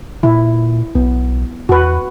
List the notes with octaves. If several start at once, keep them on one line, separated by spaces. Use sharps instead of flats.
A#2 E4
B1 B3
E2 F#4 B4